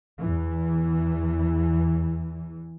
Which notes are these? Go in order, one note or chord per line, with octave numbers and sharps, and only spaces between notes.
E2 E3